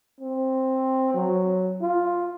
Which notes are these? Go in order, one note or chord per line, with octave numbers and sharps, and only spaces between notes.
C4
F#3
F4